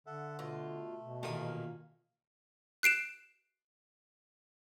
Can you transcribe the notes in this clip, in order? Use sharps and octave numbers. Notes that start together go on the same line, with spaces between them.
D3 A4 E5 F#5
B2 A3 F4
B2
A1 A#2 D#3 F5 D#6
F#6 C7 D7 E7